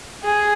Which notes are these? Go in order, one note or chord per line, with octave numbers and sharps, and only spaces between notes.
G#4